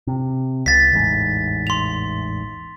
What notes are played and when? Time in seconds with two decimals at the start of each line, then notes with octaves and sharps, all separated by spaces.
0.07 C3
0.66 C#2 A6 B6
0.93 A1 E2 G#2
1.67 C6 F7